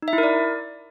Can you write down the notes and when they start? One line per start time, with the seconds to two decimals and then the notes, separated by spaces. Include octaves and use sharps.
0.02 D#4
0.08 E5
0.13 E4
0.18 A#4
0.23 D5